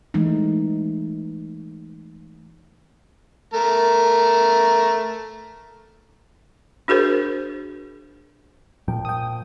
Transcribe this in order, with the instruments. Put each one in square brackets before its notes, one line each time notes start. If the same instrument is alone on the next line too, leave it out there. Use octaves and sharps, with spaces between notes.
[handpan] E3 G#3 A3 D#4
[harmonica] A3 A#4
[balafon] D4 F#4 G#4 A#4 C5
[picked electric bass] A#2 F3 [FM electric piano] G5
[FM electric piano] G5 D#6